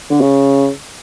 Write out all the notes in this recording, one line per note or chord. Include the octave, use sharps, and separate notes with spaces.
D3
C#3